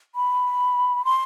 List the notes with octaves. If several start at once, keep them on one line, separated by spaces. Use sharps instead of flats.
B5
C6